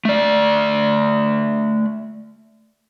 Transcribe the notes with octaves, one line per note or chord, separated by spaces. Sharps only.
A3 D5